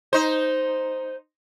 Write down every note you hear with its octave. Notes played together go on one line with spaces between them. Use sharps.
D#4 C5